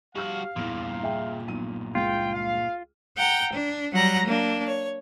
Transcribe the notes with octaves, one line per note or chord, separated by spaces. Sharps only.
G2 F#4 G4 F5 F6
E2 G2 A#2 E3
G#4 E5 G5
B1 D#7
C#2 F4 G5
F5
F#5 G5 A#5 G6
D4
F#3 G3 F#5 A#5 F#6 A#6
A#3 D4
C#5